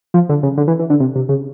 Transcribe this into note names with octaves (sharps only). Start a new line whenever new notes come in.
F3
D3
C#3
D3
E3
E3
D3
C3
C3
C#3